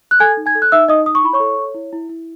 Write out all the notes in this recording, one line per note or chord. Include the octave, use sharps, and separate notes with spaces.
F#6
A4 G#5 G#6
D#4
G#5 G#6
A4
F#6
D#4 E5 E6
D#4 D#5 D#6
D#4 D#6
C#6
E4 B5
C#5 C#6
A4
C#5
E4
E4
E4